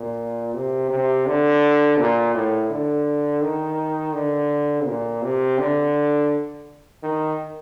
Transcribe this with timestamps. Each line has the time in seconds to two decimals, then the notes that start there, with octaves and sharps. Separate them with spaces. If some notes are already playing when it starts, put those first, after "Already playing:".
Already playing: A#2
0.54 C3
0.90 C3
1.26 D3
1.98 A#2
2.34 A2
2.70 D3
3.41 D#3
4.14 D3
4.86 A#2
5.22 C3
5.58 D3
7.03 D#3